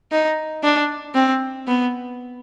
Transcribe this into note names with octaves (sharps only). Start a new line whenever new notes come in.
D#4
D4
C4
B3